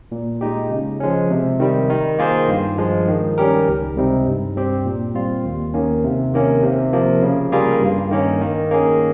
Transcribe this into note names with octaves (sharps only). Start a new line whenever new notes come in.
A#2
G#3 D#4 G4
C#3
F3 G#3 C#4
C3
D#3 G3
D#3
A#3 F4 G#4 C5
G2
F3 G#3
D#3
G3 C#4 G4 A#4
C#2
C3 G3 C4 D#4
G2
G3 C4 G4 C5
A#2
G3 C4 F4
D#2
D#3 A#3 C#4
C3
D#3 A#3 C#4
C3
F3 A#3
C#3
G3 A#3 F4 G#4
G2
D#3 A#3 C#4
D#3
A#3 C#4 G#4